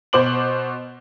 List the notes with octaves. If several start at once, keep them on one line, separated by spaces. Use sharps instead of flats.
B2 C5 D6 F#7